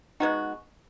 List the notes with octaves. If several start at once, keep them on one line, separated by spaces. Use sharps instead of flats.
G#3 B3 D#4 F#4